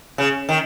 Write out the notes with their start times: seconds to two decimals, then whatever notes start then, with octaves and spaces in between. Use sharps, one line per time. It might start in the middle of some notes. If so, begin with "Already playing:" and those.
0.18 C#3
0.49 D#3